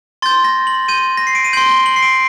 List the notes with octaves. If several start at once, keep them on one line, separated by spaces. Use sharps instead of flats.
C6 G6 A6
A#6
F#7
C6 G6 D#7
A#6
C7
D7
D#7
C6 G6 F#7
G7
F#7
C7
D7